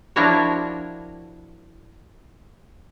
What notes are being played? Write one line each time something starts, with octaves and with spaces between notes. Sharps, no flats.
F3 D4 E4 F#4 A#4 C#5